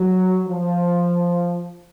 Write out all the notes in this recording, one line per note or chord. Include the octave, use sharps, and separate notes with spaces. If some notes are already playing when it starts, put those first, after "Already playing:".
Already playing: F#3
F3